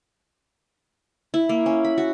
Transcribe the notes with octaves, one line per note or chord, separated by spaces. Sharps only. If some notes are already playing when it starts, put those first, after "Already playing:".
E4
A#3
C#4
B5
F#4